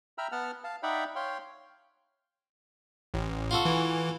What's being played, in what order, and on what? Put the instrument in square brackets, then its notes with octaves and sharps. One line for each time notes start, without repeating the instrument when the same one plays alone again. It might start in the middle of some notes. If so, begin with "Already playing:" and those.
[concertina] E5 G5 A#5 B5 E6 F6
B3 F#5 A5 F6
F5 A5
D#4 D5 E5 F#5 G5 B5
C#5 F5 G5 C6
[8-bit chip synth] A1
[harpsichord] F4 F#4 A4
[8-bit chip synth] E3